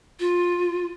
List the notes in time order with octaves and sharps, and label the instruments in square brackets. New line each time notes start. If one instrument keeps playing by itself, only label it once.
[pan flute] F4